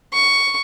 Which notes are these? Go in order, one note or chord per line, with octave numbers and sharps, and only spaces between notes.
C#6